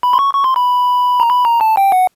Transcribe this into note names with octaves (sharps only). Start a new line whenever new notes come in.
B5
C6
C#6
C#6
C6
B5
A#5
B5
A#5
A5
G5
F#5